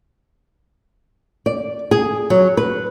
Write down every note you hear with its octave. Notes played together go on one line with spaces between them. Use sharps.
D5
G#4
F#3
B4